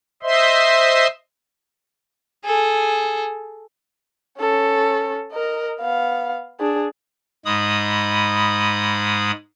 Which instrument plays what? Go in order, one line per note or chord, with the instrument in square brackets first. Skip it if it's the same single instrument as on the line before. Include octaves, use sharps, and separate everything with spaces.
[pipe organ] C5 D#5 E5 C6
[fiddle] G#4 A4
[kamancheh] C#4 A4
A#4 D#5
B3 F5
D4 G#4
[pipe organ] G#2 G#3 B5 D#6